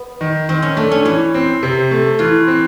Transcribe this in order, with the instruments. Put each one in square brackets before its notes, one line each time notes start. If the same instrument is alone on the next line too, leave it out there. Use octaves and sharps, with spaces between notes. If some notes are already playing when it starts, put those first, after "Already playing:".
Already playing: [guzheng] B3
[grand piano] D#3
[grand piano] D#3 [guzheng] C4
[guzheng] C#4
[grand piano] A3 [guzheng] D4
[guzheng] C#4
[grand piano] E3 [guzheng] C#4
[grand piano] C4
C3
A3
[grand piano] E3 [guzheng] F4
[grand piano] C4